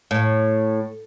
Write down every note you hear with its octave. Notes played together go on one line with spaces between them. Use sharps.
A2